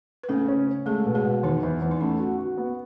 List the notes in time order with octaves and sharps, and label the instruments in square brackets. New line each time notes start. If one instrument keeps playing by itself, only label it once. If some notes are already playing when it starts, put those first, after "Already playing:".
[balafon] B4
[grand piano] C#3 [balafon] A3 A4
[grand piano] C#4
C#4
[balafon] G#3 G#4 [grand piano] A3
[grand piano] B2
[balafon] G#3 G#4
[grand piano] B2
[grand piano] E2 [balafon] D#3 D#4
[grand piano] E2
E2
[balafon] D#4
[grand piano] A3 [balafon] C#4
[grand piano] F#4
F#4
B3